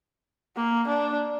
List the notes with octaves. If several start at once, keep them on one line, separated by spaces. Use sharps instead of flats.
A#3
D4